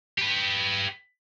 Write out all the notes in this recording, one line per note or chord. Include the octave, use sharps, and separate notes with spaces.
G4 B4